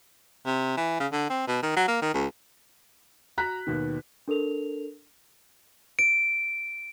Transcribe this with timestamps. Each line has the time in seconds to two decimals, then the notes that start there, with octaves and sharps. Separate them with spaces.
0.46 C3
0.77 E3
1.00 C#3
1.12 D3
1.30 C4
1.48 B2
1.63 D#3
1.76 F#3
1.88 A#3
2.02 D#3
2.14 C#2
3.38 F#4 A#5 F#6 B6
3.67 D#2 B2 D#3
4.28 D4 A4 A#4 F7
5.99 D7